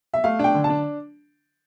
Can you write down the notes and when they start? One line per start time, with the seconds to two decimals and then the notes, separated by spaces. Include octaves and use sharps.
0.14 E5
0.24 A3 F5
0.39 D4 G5
0.54 D3
0.64 A5
0.70 D4